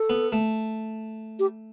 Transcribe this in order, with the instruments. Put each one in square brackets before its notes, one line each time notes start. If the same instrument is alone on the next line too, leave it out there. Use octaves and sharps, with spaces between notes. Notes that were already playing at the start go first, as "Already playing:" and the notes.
Already playing: [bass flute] A4
[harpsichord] B3
A3
[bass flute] G4